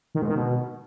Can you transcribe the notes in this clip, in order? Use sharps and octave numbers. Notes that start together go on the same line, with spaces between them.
D#3
G#2
D#3
B2